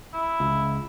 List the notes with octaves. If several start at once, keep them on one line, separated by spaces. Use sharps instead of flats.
E4
C#2